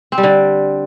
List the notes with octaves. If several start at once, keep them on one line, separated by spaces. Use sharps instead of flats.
C4
G3
D3